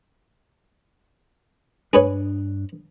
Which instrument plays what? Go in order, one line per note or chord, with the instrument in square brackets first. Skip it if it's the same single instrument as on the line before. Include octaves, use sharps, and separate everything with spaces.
[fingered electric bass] G2 D4 [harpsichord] G#4 B4 C#5